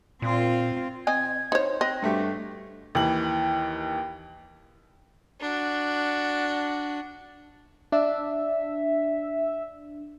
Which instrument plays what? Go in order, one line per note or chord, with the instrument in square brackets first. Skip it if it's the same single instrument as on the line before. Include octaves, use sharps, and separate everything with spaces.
[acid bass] A#2 [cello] C4 F4
[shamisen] C4 D#5 G#5 [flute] G#6
[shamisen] D#4 C#5 [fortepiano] C5
[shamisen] C4 D#5 [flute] F#6
[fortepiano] G2 A3 G4 [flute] F#4
[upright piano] D#2 E3 F#7
[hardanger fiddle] D4 F#4
[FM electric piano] D4 [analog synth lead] E5